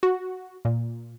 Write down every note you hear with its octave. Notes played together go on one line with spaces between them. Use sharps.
F#4
A#2